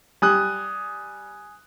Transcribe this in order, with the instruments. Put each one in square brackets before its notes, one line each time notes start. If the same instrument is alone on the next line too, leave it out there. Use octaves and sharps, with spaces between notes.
[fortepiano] G3 [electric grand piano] G#5 D#6 F#6